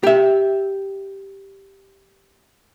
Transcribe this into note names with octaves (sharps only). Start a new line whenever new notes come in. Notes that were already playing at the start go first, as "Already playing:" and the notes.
G4 E5